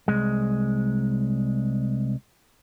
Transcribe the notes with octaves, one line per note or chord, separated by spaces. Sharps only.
C2 G#3